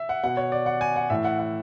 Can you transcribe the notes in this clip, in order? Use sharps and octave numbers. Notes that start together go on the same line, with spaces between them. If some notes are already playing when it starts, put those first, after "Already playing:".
Already playing: E5
F#5
B2 F#5
C#5
D5
F#5
G#5
F#5
A2 E3 E5
F#5
F#5